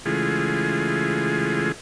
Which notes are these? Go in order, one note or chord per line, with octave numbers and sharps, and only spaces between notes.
C#3 E3 G#3 A3 F4 G#4